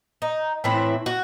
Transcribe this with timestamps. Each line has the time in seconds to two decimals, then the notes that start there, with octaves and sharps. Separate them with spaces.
0.22 D#4
0.64 A2 E3 C4 E4
1.06 F#4